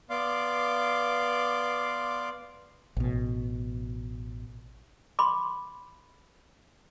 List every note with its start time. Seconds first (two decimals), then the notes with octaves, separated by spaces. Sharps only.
0.10 B3 D5 F5 C6 D6
2.97 A1 B2
5.19 B5 C6 D6